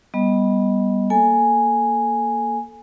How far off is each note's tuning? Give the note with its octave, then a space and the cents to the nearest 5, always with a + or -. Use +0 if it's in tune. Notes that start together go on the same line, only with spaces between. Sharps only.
G3 +0 B3 -10 D#5 +10
A#3 +0 A4 +0 G#5 +0